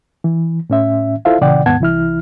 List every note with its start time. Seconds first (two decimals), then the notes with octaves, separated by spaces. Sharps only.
0.24 E3
0.70 A2 C#4 E5
1.25 E4 F4 A4 C5 E5 F5
1.41 A#2 C#3 E3 D5 F#5 G5
1.66 D#2 G#2 B3 F#5 A5 G#6
1.80 C2 E3 E4 F6